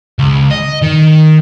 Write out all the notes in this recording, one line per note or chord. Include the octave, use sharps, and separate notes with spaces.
C#2
D#5
D#3